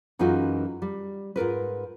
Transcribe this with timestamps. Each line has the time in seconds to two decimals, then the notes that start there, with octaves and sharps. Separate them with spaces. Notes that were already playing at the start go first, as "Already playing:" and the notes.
0.19 F#2 E3 G#3 D#4 F4 F#4
0.82 G3
1.36 G#2 F4 A#4 B4